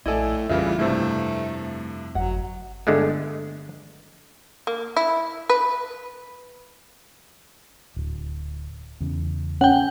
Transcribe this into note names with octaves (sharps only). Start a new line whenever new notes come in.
A#1 A2 E4 A4 D5 D#5 G#5
F2 C#3 E3 G3 F4 A#4 E5
G2 C3 A3 E4 A4 C5
G1 F#3 F#5
G1 D3 G#3 A3
A#3
E4
B4
D1
E2 C#3
C#4 F#5 G5